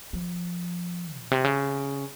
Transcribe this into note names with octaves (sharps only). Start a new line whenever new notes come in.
F3
A#2
C3
C#3